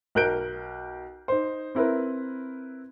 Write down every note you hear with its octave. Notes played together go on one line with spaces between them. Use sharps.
B1 A#4 F#6 G6 D7
D#4 C5
C4 E4 A#4 B4